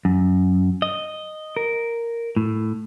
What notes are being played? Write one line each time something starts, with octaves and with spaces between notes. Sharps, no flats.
F#2
D#5
A#4
A2